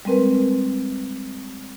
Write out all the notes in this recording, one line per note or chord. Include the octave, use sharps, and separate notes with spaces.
G3 G#3 C4 A#4 B4